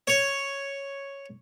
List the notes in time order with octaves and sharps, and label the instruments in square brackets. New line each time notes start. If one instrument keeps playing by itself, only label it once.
[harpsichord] C#5